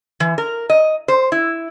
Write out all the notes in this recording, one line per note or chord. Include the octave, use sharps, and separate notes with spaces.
E3
A#4
D#5
C5
E4